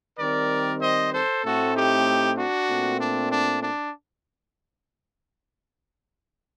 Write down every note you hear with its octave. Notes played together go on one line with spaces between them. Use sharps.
D#3 G3 C4 A#4 D5
C5 D#5
A4 C5
A2 A3 C4 F#4 A4
D#4 G4
D4 F#4
A#2 A3 C4
D4
D4
D4